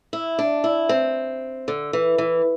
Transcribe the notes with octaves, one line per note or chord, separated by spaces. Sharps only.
E4
D4
E4
C4
D3
E3
E3